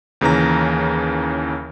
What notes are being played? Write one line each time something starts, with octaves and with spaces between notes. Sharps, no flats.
D#2 C#3 E3 A#5 A#6